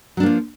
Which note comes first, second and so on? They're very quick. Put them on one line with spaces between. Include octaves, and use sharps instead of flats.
F#3 D4 A#3 F3